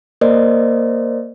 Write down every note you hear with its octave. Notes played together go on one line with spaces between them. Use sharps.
A#3 A#4 C5 D5 D#5